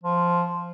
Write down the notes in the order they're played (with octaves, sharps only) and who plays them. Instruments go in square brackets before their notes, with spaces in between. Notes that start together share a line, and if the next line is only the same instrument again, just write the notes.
[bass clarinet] F3